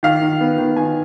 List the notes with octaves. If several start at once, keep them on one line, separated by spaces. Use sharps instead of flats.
D#3 F5
D#3
B3
D#3
D#3 G#5